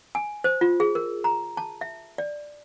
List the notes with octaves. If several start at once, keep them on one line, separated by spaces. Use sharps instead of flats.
G#5
C5
F4
G#4
A#4
A#5
A5
E5
D5